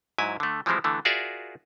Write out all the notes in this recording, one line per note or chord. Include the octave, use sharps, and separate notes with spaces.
G#2 F#3 E4 G#5
D3 A3
E3 F3 G3 G#3 C4 E4
D3 E3 A3
F4 F#4 G#4 A#4 D5 E5